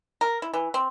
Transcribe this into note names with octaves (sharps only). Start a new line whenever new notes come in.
A#4
E4
E3
C4